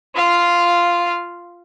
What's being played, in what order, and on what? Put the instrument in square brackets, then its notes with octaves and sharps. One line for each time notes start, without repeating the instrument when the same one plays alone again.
[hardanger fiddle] F4 F5